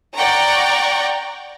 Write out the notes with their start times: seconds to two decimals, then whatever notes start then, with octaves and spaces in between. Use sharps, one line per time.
0.15 D5 F#5 G5 A#5 C#6